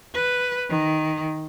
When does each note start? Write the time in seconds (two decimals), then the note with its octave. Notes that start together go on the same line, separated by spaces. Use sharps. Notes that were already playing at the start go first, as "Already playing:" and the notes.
0.15 B4
0.70 D#3